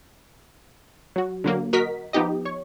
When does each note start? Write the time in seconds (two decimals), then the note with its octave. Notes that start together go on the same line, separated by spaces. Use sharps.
1.16 F#3 F#4
1.44 D3 F#3 A#3
1.73 F#4 A#4 D#5 B6
2.13 F3 B3 D#4 G4 D#5
2.45 C#5 C#6